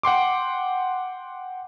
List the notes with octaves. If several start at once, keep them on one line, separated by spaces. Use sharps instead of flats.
F#5 G5 C6 D6